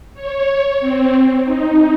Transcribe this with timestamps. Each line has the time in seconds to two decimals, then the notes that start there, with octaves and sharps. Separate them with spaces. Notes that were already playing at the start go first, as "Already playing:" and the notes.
0.14 C#5
0.80 C4
1.44 D#4